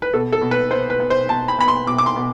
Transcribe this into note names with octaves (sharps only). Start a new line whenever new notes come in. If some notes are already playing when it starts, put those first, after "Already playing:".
B4
B2 A4
A4
B2
B4
B3 C5
B4
B3
C5
B2 A5
B5
B3 B5
C6
B2 D6
D6
C6
B2